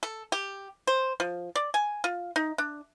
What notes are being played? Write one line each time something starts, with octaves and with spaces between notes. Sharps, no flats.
A4
G4
C5
F3
D5
G#5
F4
D#4
D4